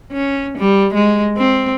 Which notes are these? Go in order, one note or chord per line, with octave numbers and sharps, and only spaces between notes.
C#4
G3
G#3
C4